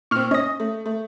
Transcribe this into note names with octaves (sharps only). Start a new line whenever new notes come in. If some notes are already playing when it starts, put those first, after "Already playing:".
A#2 C4 C#6 F6
C#4 D#5 D#6 A#6
A3
A3